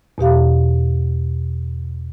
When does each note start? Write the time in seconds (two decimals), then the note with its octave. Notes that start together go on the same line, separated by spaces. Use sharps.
0.18 E2 B2 G4 F5